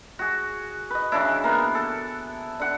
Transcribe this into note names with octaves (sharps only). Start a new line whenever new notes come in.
F#4 G#4
B4 D#5
C#3 E3 D4 E4
A#3 B3
A4
D3 F#5